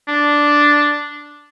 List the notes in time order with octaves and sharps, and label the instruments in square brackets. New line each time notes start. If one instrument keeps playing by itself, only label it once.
[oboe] D4